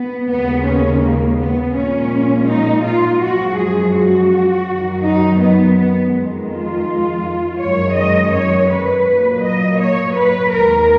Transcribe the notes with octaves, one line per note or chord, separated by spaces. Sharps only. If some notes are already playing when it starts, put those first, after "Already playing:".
Already playing: B3
D#2 C#3 G#3 B3
C#4
A#3
B3
A#2 F3 G#3 C#4
D#4
F4
F#2 F3 G#3 F#4
G#4
F#4
F#2 D#3 F#3
D#4
B3
B3
F2 D#3 G#3
F4
F#2 D#3 G#3 C#5
D#5
C#5
B4
A#2 F#3 A#3
D#5
C#5
B4
D#2 D#3 G#3 A#4